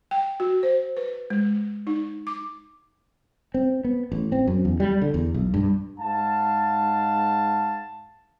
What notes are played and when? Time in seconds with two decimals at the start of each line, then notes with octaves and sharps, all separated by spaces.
0.11 G5
0.40 F#4
0.63 C5
0.97 B4
1.30 G#3
1.87 D#4
2.27 D6
3.54 C4
3.84 B3
4.12 A1
4.32 C4
4.47 F#2
4.65 E2
4.80 G3
5.02 D3
5.14 E2
5.34 B1
5.54 G2
5.99 G#2 F5 F#5 A5